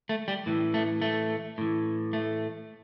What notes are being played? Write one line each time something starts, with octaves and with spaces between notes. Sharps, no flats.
A3
G3
A2 E3
A3
A3
A2 E3
A3